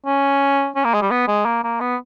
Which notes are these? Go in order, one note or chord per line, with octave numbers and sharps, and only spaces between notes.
C#4
C#4
A#3
G#3
G3
B3
G#3
A#3
A#3
B3